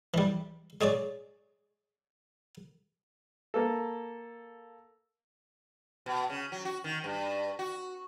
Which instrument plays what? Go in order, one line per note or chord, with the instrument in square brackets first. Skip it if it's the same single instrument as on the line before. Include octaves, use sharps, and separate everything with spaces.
[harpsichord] E3 G3
G#3 G#4 C#5 D5
[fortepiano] A#3 A4
[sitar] B2
C#3
F#3
F#4
D#3
G2
F#4